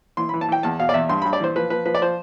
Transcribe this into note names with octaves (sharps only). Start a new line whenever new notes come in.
E3 C6
E3 B5
A5
E3 G5
E2 A5
B2 F5
D5
E2 E5
G2 C6
G2 B5
D5
E3 C5
F3 B4
F3 B4
F3 B4
D5
F3 C5